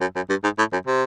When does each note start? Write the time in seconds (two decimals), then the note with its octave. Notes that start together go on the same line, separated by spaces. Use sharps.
0.01 F#2
0.16 F#2
0.29 G2
0.44 G#2
0.58 A2
0.72 F#2
0.87 C3